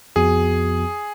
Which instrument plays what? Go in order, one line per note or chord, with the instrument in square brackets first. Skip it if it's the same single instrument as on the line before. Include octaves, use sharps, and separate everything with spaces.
[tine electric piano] F2 F3 B3 F#4 [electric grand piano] G#4